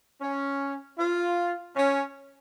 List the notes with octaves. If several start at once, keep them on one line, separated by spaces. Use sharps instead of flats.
C#4
F4
C#4